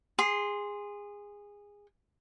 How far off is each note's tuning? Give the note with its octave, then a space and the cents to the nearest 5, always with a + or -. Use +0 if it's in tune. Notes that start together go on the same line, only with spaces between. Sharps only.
G#4 -20 C6 +0